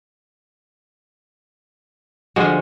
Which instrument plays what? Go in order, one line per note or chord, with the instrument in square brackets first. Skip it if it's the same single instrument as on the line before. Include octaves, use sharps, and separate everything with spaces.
[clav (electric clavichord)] D3 F3 F#4 [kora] G#3